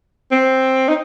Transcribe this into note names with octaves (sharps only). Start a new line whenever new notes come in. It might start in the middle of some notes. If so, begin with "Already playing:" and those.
C4
D#4